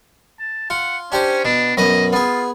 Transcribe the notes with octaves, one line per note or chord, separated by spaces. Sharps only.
A5
F4 F#5
C#4 D4 G4 C5
B2 D4
F#2 B2 D#5 B5
B3 F4 G#4